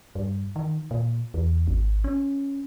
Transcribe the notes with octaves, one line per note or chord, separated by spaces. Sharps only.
G2
D#3
A#2
E2
G#1
C#4